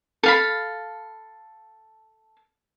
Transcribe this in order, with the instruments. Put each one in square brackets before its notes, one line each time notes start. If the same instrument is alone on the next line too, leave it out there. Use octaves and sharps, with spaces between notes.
[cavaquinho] A4 F5 B5